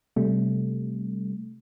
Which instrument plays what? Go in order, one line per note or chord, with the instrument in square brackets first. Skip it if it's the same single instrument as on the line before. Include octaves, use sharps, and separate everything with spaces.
[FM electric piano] C3 G3 A3